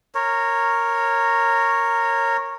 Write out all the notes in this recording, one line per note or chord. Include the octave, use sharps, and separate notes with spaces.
A#4 C#5